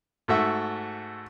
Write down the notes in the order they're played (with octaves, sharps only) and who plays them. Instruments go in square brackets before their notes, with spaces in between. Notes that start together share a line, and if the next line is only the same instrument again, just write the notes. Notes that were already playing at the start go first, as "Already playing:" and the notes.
[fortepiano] G#2 A3 F#4 E5